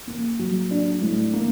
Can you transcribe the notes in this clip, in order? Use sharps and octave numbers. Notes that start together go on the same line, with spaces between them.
A#3
F#3
D4
A2
A#3